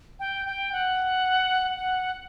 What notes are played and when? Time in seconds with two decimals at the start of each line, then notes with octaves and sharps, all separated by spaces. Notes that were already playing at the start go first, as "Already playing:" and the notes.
0.20 G5
0.46 G5
0.73 F#5
1.76 F#5